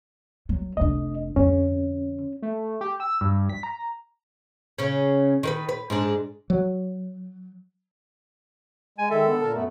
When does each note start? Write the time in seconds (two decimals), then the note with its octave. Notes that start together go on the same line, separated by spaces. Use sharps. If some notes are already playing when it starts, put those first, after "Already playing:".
0.49 F#3
0.77 F1 D4 D#5
1.36 F2 D3 C#4
2.42 A3
2.81 G4
3.00 E6
3.21 G2
3.50 B6
3.63 A#5
4.78 C#3 C#4
5.43 D#3 A#4 B4
5.69 B4
5.90 G#2 G#3 D4
6.50 F#3
8.98 G#3 G#5
9.10 D#3 G#3 A4 E5
9.26 D3 B3
9.41 A#2 A#4 A5
9.53 F#2 A3 B3